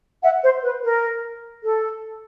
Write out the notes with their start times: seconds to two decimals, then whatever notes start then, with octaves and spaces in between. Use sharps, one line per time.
0.22 E5 F#5
0.43 C5
0.62 B4
0.83 A#4
1.63 A4